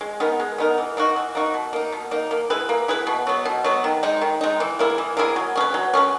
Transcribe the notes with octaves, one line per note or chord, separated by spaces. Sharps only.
G#3
B3 D#4 A#4
G#3
B3 D#4 A#4
E3
A#3 D#4 F#4
E3
A#3 D#4 F#4
B2
A#3 D#4
B2
A#3 D#4
A#3
E4 G#4 B4
A#3
E4 G#4 B4
B2
F#3 B3
B2
F#3 B3
D#3
G#3 D#4
D#3
G#3 D#4
E3
A#3 E4 G#4
E3
A#3 E4 G#4
F#3
C#4 G#4 B4
F#3
C#4 G#4 B4